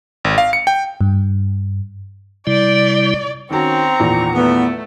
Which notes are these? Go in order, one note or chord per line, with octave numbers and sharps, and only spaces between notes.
G#1
F5
C#7
G5
G2
C3 G3 E4 D5
D#3 C4 C#4 F#4 A#5 C#6
E2 A#2 D#3
A3 B3